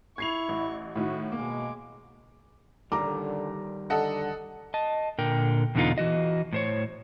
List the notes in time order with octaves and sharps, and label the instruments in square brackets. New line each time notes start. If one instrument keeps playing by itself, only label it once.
[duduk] E4 [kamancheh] C#6 [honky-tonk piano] G#6 C7 F7
[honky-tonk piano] A1
[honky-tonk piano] A2 D#3 [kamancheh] E4 [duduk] F#4
[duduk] B2 [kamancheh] G#3 D6 [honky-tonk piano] A#3
[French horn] D3 [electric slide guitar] D#3 G3 [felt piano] A#5 D6
[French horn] D3 [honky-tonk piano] A4 D#5 F#5
[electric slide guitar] D#5 A5
A#2 D3 A#4 G5
E2 B2 D3 D#4 F4
E3 F#4 D#5
A2 C5 C#5